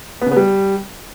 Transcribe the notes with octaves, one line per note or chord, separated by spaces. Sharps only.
B3
C#3
B3
G3